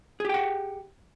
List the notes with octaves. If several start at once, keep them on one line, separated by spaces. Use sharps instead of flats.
G4 G#4 F#5 G5